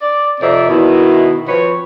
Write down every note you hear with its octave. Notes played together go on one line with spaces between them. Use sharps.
D5
F2 C3 C4 D#4 D5 E5
B2 D#3 E4
F3 C4 B4 C#5